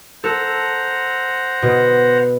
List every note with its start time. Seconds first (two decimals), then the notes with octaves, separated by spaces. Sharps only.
0.24 A4 C5 F#5 A#5
1.62 B2